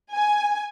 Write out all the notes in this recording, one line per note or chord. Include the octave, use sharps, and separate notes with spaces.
G#5